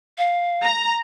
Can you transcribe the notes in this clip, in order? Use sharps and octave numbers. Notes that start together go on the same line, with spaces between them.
F5
A#5